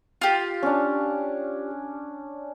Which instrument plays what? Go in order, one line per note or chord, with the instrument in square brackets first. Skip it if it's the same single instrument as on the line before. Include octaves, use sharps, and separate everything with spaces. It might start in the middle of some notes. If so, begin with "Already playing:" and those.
[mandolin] F4 G4
[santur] C#4 D4